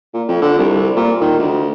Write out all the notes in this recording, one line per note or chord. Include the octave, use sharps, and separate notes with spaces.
A#2
F2
D3
C2
A#2
D#3
D2